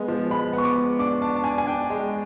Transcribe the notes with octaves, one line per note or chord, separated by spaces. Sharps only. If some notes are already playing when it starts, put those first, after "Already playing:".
Already playing: G#3 B3
F3
G#3 B5
B3
C#6
D6
G#3
D4 D6
D4 A5
A5
D4 G#5
G#5
D4 G5
G#3